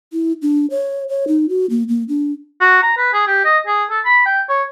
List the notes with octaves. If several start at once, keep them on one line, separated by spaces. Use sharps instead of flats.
E4
D4
C#5
C#5
D#4
F#4
A#3
A#3
D4
F#4
A#5
B4
G#4
G4
D#5
G#4
A4
B5
G5
C#5